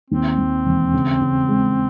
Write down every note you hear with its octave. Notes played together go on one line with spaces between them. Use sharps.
D#2 C4
D#2
E1
C#3
C#3
G#3